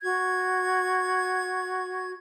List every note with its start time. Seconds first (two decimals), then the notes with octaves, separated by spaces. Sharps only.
0.01 F#4 G#6